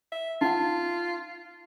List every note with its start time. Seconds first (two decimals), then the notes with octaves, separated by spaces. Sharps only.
0.12 E5
0.41 D#4 F4 F#5